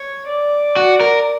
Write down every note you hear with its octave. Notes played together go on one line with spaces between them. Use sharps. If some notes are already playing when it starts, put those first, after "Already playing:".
Already playing: C#5
D5
F#4
A#4